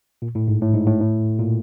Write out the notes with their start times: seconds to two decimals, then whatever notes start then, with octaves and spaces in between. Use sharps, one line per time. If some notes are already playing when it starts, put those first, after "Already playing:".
0.22 A#2
0.35 A2
0.48 G#2
0.61 A2
0.74 G#2
0.87 A2
1.00 A2
1.39 A#2